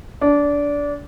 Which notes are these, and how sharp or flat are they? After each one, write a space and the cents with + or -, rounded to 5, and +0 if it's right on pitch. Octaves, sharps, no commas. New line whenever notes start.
D4 -20